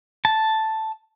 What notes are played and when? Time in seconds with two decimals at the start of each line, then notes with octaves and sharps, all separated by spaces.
0.25 A5